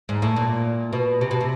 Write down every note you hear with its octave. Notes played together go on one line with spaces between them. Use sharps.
G#2
A2
A#2
B2
C3
B2
C3